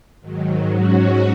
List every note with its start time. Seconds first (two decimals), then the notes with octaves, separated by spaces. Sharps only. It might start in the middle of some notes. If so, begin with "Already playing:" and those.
0.21 G#2 D#3 F#3
0.68 G#2 F#3 C#4 F#4